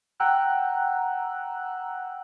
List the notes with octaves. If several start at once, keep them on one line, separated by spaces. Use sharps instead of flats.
F#5 G5 A#5 E6 F#6